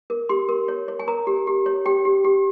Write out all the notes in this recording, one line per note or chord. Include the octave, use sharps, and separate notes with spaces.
A#4
G4 C6
A#4
C#5
C#5
G#5
A#4 A#5
G4
G4
C#5
G4 G5
G4
G4